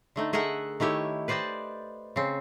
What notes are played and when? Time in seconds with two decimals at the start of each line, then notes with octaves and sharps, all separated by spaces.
0.16 D3 A3 D#4
0.33 A3 G#4 A#4 E5 F#5
0.80 D#3 A3 E4 G4 C#5
1.28 B4 C5 D5 D#5 G5 A5
2.16 C#3 C4